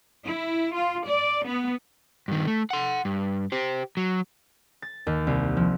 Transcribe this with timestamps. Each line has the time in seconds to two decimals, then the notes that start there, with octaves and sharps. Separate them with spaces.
0.25 E4
0.74 F4
1.07 D5
1.45 B3
2.28 G2 D#3
2.47 A3
2.70 F#5 C6
3.05 G2
3.52 G4 C5
3.97 F#3
4.82 A6
5.07 D#2
5.27 C2
5.57 F3